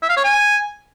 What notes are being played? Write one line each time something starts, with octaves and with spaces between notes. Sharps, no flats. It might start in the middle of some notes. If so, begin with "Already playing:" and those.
E5
F5
C#5
G#5